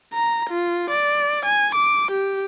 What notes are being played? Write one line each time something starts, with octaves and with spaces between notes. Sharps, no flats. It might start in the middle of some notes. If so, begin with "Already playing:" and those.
A#5
F4
D5
G#5
D6
G4